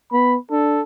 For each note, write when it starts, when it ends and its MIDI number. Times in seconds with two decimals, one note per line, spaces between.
0.12 0.37 59
0.12 0.37 83
0.51 0.82 62
0.51 0.82 69